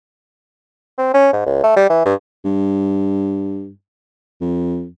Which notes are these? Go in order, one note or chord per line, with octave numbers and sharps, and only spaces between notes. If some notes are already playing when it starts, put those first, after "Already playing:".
C4
C#4
G#2
C#2
A3
G3
E3
G2
G2
F2